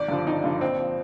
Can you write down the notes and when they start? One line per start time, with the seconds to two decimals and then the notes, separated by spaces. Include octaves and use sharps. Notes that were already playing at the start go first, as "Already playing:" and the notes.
Already playing: G#1 D5
0.08 G2 D3 F3
0.26 G#1 D#4
0.44 G2 D3 F3
0.61 A#1 C4
0.79 F3